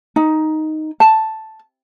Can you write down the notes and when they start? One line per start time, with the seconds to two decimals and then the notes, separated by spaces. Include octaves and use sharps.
0.16 D#4
1.00 A5